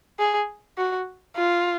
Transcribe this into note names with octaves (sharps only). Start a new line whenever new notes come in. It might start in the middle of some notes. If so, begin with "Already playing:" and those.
G#4
F#4
F4